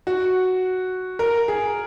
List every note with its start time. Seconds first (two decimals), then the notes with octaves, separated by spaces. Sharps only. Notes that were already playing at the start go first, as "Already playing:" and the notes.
0.07 F#4
1.19 A#4
1.48 G#4